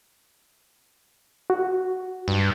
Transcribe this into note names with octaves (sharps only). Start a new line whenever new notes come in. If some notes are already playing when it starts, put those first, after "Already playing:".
F#4
G2